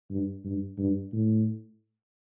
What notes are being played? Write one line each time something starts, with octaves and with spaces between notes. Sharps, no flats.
G2
G2
G2
A2